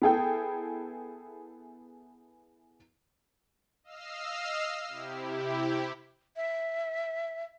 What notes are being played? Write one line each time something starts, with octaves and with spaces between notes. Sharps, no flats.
B3 E4 G#4 A4 G5
D#5 F5 E6 F6 C7
C3 E4 G4
E5